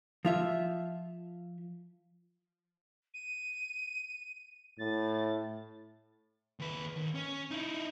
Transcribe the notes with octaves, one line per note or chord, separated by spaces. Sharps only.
F3 F4 E5
D#7
A2 A6
D#2 B4
D#2
C#4
D#4 E4